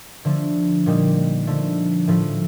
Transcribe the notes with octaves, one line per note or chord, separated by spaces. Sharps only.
D3 F3 A3
A#2 G3 A#3 D#4
D3 F3 A3
A2 F3 A3